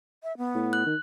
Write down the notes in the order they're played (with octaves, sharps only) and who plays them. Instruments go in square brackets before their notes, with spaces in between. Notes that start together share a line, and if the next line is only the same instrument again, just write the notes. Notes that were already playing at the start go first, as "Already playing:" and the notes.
[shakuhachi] E5
B3
[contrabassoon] A2
[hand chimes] F#6
[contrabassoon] D#3